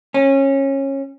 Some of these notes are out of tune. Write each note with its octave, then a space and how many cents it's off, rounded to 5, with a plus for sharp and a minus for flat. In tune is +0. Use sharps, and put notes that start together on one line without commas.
C#4 -20